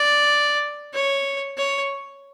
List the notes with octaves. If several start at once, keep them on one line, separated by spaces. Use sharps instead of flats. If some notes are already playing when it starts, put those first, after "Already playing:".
Already playing: D5
C#5
C#5